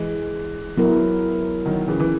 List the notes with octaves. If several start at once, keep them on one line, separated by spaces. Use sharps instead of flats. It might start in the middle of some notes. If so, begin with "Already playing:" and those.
Already playing: E3 G#3
F#3 B3 E4 A#4
D#3 F#3
C#3 E3
E3